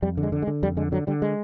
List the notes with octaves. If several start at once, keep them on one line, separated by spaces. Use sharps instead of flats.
F2 G3
D3
G#3
D3
G#3
D3
F2 G3
D3 G#3
D3 F#3
D3 G3
G#3